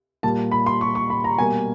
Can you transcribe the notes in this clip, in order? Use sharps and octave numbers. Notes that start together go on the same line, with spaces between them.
A#2 G3 A#3 A5
B5
C6
C#6
C#6
B5
A#5
B2 G3 A#3 G#5